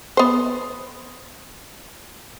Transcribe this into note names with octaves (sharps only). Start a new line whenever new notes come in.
B3 C5